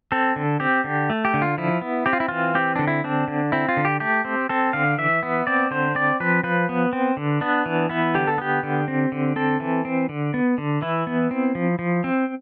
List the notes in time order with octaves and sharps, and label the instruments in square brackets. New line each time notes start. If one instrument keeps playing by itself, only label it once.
[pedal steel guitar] C4 A4
D3
C4 G4
D3
A3
G4
D3
F4
F3 E4
B3
C4 G4
F4
E4
E3 F4
C4 G4
D3 D4
E4
C4 D4
D3
C4 E4
F4
D3
G4
A3 G4
C4
C4 A4
D3 F5
E3 E5
B3
C4 D5
D3 C5
C4 D5
F3 B4
F3 B4
B3
C4
D3
B3 D4
E3
B3 E4
D3 G4
A4
B3 G4
D3
C4
D3
C4 A4
E3
C4
D3
B3
D3
E3 E4
B3
C4
F3
F3
C4